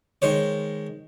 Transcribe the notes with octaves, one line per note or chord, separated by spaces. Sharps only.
D#3 G#3 C5 C#5